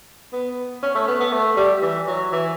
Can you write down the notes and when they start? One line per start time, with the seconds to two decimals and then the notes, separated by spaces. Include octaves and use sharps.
0.33 B3
0.82 C#4
0.95 A3
1.08 B3
1.20 B3
1.32 A3
1.57 G3
1.82 E3
2.07 F#3
2.32 E3